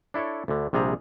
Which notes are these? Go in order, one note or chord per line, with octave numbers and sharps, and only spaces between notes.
D4 E4 A4 C#5
D2 D3
A#1 C3 G3 G#4 A#5